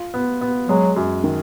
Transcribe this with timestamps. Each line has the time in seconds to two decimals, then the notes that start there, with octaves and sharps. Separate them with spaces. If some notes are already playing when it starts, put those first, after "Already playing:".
Already playing: F4
0.14 B3
0.41 B3
0.68 F#3 G#3
0.96 F#2
1.24 D#3